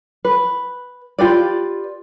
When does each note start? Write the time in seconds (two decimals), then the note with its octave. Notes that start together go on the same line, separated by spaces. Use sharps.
0.25 B4
1.19 F4 G4 B4 D5